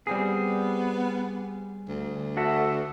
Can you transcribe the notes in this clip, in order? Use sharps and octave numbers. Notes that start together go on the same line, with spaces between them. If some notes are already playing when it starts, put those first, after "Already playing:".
G3 B3 C4 G#4
D2
F#4 A4 E5